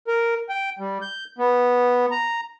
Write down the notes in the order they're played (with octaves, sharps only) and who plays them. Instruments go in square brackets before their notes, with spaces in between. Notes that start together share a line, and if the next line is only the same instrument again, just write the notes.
[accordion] A#4
G5
G3
G6
B3
A#5